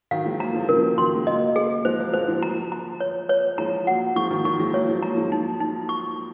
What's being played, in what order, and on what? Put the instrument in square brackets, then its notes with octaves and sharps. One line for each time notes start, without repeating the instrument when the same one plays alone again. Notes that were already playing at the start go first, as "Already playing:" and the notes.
[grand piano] D#3 F#3 [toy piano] F5
[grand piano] F3 G#3
[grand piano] F#3 A#3 [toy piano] A#5
[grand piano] F3 G#3
[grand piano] C#3 F3 [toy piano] A#4
[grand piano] D#3 F#3 [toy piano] C6
[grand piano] G#3
[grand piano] F#3 A#3 [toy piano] D#5
[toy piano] G#4
[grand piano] F3 G#3 [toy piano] C5
[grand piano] F#3 A#3
[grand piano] F3 G#3 [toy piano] C5
[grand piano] F3 G#3
[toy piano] A#5
A#5
C#5
C#5
[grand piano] F3 G#3 [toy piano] A#5
[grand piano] F#3 A#3 [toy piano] F#5
[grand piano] F3 G#3 [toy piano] C#6
[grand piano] D#3 F#3
[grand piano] D#3 F#3 [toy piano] C#6
[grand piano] F3 G#3
[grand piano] F#3 A#3 [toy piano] C#5
[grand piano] F3 G#3
[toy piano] A#5
[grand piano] F3 G#3
[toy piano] D#4
D#4
C#6